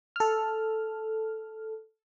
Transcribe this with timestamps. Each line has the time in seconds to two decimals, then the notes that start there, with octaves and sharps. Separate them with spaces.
0.16 A4 F6